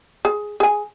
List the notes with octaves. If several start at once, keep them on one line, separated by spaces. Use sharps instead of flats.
G#4
G#4 G#5